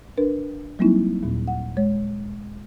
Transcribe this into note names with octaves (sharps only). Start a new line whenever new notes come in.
D4 A#4 B4
F#3 G3 A#3 C4 D#4 E4
D#2 A#2
F#5
G#3 C#5